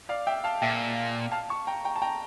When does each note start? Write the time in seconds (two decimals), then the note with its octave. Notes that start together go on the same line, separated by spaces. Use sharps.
0.09 D5 F5
0.27 E5 G5
0.44 F5 A5
0.62 A#2 E5 G5
1.32 F5 A5
1.49 A5 C#6
1.67 G5 A#5
1.85 G5 A#5
1.96 A5
2.02 G5 A#5